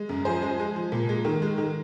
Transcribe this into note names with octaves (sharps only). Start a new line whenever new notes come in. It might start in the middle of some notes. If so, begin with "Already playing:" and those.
Already playing: G#3
F#2
F3 G#4 C5
G#3
G#3
F3
A#2
G#3
D#3
G#3
D#3